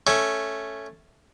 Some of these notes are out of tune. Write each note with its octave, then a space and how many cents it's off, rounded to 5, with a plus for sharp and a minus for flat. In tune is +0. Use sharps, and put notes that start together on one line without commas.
A3 +0 C#4 +0